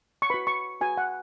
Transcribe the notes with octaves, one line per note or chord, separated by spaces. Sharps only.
C#6
F#4 B4 B5
C#6
F#4 B4 G#5
F#5